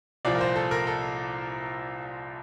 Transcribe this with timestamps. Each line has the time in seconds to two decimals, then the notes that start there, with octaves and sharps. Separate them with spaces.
0.25 C2 A#2 F3 D5
0.35 A#4
0.41 C5
0.56 A4
0.71 A#4
0.87 A4